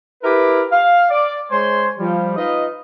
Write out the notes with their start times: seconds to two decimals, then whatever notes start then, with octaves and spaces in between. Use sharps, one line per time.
0.23 E4 G4 A#4 B4
0.72 F5
1.10 D5
1.51 G#3 C5 C#5 G#5 C6
1.98 F3 G3
2.36 D#4 F4 B4 D#5